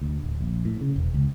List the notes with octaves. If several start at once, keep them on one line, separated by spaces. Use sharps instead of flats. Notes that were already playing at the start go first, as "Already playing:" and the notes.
D2
D1
A#1
A2
C#3
E1
C#2